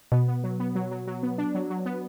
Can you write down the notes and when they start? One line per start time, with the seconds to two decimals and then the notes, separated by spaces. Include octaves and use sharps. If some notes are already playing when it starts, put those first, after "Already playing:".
0.12 B2 B3
0.28 B3
0.44 F#3
0.60 B3
0.75 F#3
0.91 F#3
1.07 F#3
1.23 B3
1.38 D4
1.55 F#3
1.70 F#3
1.86 B3